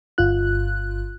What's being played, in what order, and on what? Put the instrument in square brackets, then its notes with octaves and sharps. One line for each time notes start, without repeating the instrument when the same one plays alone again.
[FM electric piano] G1 F4 F#6